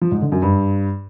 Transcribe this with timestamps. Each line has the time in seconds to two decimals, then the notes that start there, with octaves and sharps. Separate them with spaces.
0.02 F3
0.12 G#2
0.22 D3
0.32 F#2
0.42 G2